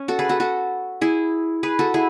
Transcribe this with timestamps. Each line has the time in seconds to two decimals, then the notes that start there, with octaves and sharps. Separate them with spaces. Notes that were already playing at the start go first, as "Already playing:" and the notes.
Already playing: C#4
0.08 F#4 A4
0.19 G#4 B4
0.29 F#4 A4
0.40 F#4 A4
1.01 E4 G#4
1.63 G#4 B4
1.79 F#4 A4
1.94 E4 G#4